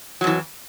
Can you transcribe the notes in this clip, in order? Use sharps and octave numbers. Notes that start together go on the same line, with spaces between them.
F2 E3 F#3